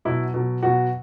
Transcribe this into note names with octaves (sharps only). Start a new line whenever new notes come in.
B2 F#3 E4
B2 F#3
B2 F#3 F#4